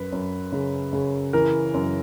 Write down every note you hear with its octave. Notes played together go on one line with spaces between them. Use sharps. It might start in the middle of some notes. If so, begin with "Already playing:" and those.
Already playing: F#2 B4
F#2
C#3
C#3
E3 A#4
F#2